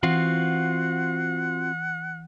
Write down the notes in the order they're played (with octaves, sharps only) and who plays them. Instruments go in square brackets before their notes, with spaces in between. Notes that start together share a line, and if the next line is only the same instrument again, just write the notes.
[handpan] E3 [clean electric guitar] C4 F4 F#4 [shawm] F#5